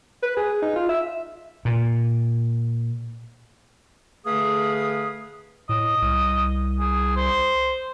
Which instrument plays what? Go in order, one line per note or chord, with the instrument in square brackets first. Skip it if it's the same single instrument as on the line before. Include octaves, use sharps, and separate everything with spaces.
[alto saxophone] B4
G#4
D#4
F4
E5
[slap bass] A#2
[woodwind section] D3 A3 G#4 B4 F5 D#6
[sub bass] A2 [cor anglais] D#5
[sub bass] C2
[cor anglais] G#4
C5